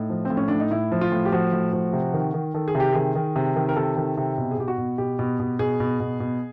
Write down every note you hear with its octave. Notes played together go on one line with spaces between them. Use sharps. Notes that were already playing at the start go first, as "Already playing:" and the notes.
Already playing: A2 D#4
F3
C4
A2
C#4
A2 D4
D#4
A2 E4
F3
F4
A2
G4
F3 F#4
A2
F3
C3
D#3
D#3
D#3 A4
G#4
C3
G4
D#3 G#4
D#3
C3
D#3
A#4
C3 A4
D#3
C3
B2
G#4
B2 G4
F#4
B2
B2 G4
B2
B2
B2 G#4
B2
B2
B2